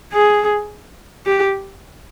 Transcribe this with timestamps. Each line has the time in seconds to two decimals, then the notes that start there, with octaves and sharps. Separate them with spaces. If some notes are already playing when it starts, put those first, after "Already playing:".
0.13 G#4
1.26 G4